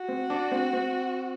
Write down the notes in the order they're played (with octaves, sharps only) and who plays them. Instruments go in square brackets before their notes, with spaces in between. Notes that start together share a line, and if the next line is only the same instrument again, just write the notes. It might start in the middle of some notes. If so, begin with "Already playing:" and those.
Already playing: [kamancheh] F#4
[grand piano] C4
D4
C4
C4